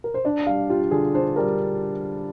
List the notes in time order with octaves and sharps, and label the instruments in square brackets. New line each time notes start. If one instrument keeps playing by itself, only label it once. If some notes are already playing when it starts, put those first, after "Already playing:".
[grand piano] A#4
C5
[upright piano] D4 [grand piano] D5
[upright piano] G3 [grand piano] F5
[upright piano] F4 [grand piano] G4
[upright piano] D3 [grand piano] G#4
[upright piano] D4 [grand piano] C5
[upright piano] G3 [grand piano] A#4